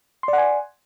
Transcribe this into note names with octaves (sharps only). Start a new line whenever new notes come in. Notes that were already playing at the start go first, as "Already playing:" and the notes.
D5 F#5 G#5 C6